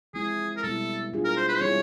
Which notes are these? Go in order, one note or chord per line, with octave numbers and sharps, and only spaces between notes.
F3 G#3 C4 E4 G#4
A#4
B2 G3 B3 E4 A4
A3 D4 F4 G#4
A#4
C5
B4
C5
G3 C4 E4 G#4 C#5